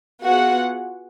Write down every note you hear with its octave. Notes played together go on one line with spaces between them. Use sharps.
B3 F4 F#4 G#4 F#5